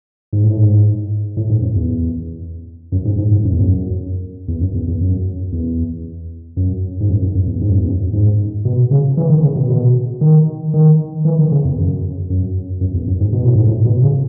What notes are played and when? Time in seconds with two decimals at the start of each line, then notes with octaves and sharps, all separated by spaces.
0.33 G#2
0.44 A2
0.57 G#2
1.37 A2
1.50 G#2
1.62 F#2
1.75 E2
2.92 F#2
3.05 G#2
3.18 G#2
3.31 G#2
3.44 F#2
3.53 E2
3.61 F#2
4.48 E2
4.61 F#2
4.74 E2
4.87 E2
5.01 F#2
5.52 E2
6.57 F#2
7.00 G#2
7.09 F#2
7.22 F#2
7.35 F#2
7.47 E2
7.61 G#2
7.70 F#2
7.78 E2
7.88 F#2
8.13 G#2
8.65 B2
8.91 C#3
9.17 E3
9.30 D#3
9.42 C#3
9.56 B2
9.70 B2
10.21 D#3
10.74 D#3
11.25 E3
11.39 D#3
11.52 C#3
11.64 E2
11.78 F#2
12.30 F#2
12.81 F#2
12.94 E2
13.08 F#2
13.20 G#2
13.33 B2
13.44 A2
13.55 G#2
13.67 A2
13.85 B2
14.02 C#3